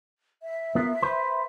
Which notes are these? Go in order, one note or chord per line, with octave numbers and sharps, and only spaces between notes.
E5
B3 F4 A#4
B4 C5